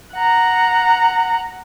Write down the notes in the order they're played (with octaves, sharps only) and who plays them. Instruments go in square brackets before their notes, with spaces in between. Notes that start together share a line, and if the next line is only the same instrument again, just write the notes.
[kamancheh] F#5 A#5